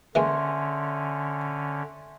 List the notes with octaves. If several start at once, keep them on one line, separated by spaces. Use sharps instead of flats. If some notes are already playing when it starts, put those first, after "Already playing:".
D3 E3 G#3 A#3 C#4 E5 G#5 C6